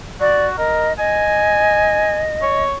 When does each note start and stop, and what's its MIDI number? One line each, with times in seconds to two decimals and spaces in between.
0.20 0.55 66
0.20 0.46 74
0.58 0.89 70
0.58 0.93 75
0.99 2.64 75
0.99 2.20 80
2.42 2.78 73